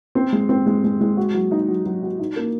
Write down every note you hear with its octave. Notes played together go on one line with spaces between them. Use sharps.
C4
G#3
C4
G#3
G#3
G#3
F#4
F#3
D#4
F#3
F#3
F#4
D#4
A#3